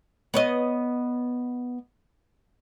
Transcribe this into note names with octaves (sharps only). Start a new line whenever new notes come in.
B3 C#5 D#5